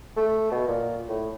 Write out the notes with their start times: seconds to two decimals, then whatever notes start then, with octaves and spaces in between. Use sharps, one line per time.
0.16 A3
0.51 B2
0.68 A#2
1.09 A2